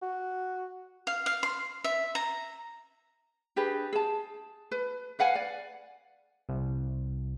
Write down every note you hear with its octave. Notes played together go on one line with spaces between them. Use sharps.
F#4
F5
F5
C6
E5
A#5
D4 G4 G#4 B4
G#4 A5
B4
B4 F5 F#5 G#5
D5
C2